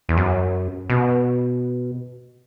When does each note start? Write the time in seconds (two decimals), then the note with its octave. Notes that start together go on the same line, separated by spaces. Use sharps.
0.09 E2
0.17 F#2
0.90 B2